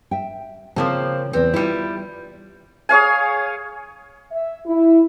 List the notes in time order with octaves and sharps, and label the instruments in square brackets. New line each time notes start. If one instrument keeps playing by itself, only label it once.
[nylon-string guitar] E5 G5
[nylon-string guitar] C#3 F4 A5 [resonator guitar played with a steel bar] F3 A#3 C4
[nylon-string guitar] E2 B4 [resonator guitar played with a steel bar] C4
[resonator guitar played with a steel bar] G3 E4 [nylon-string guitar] F4
[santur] G#4 C#5 F5 G#5
[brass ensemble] E5
E4